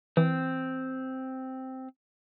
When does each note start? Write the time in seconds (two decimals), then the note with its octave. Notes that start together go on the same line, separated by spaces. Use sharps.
0.17 E3 C4